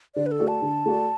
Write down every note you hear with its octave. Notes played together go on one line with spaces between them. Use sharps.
D3 D5
B4
A4
A3 F#4 D5
A5
D3
A3 F#4 D5